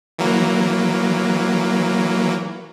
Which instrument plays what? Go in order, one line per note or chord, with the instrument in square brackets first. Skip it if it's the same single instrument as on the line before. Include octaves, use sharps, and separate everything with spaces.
[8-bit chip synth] E3 F#3 A#3